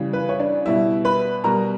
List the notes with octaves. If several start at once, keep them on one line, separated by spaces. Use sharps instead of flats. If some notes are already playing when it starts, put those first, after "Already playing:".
Already playing: C#3 E3 G3
B4
C#5
D4 D5
B2 G3 E4 E5
B4 B5
B2 G3 A#4 A#5